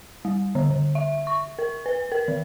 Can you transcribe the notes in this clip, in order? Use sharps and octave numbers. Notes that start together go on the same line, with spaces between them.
G3
D3
D3
E5
C#6
A#4
B4
A#4
D#3